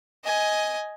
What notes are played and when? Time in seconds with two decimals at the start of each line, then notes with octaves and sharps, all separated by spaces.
0.24 D#5 G#5